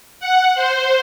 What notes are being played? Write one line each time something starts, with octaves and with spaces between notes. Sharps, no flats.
F#5
C5